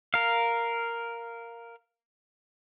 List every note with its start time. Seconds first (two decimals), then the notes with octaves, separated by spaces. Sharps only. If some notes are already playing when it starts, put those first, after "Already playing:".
0.14 A#4 F5